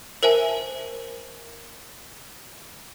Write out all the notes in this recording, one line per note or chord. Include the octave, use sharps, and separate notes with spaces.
A#4 C5 E5 G#5 A5